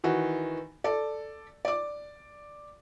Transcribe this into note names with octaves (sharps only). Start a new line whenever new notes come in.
D#3 E3 F#4
A4 D5
D5 D6